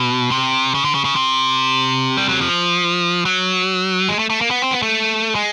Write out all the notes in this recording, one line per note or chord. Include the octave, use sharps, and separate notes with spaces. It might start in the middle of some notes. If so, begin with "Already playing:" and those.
Already playing: B2
C3
C#3
D3
C#3
C#3
C3
G3
F#3
F3
F#3
G#3
A3
A3
A#3
B3
C4
B3
A3
G#3